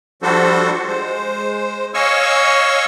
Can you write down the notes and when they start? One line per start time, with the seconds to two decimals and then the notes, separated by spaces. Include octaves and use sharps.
0.22 F3 G3 D4 F#4 A4 C5
0.88 G#3 C5
1.94 C#5 D#5 F5 G#5 C#6 E6